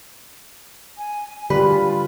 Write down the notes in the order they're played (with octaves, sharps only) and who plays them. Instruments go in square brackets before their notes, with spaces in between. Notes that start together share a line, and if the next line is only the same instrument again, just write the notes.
[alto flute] G#5
[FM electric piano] D3 [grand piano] G3 [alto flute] F4 [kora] B4